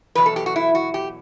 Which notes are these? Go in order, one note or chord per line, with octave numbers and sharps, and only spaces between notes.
E2 B2 F#3 B4
A4
G4
F#4
E4
F#4
G4